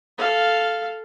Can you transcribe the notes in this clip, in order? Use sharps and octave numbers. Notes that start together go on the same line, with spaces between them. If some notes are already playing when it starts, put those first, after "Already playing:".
A4 F5